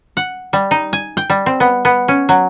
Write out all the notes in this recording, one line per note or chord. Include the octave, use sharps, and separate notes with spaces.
F#5
G3
D#4
G#5
G5
G3
C4
B3
B3
C#4
F#3